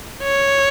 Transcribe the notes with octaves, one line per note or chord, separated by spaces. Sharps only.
C#5